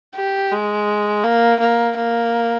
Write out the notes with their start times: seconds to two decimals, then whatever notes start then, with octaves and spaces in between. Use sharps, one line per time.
0.15 G4
0.52 G#3
1.24 A#3
1.60 A#3
1.97 A#3